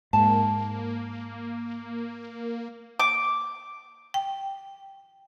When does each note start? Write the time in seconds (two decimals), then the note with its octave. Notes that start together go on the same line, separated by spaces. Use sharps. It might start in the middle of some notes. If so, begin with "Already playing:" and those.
0.13 G#2 A#3 A5
3.00 D6
4.14 G5